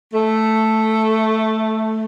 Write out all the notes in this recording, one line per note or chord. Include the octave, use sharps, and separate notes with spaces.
A3